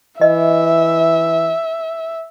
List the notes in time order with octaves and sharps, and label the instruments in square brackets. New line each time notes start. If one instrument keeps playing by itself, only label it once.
[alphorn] E3 [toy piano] D#5 [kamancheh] E5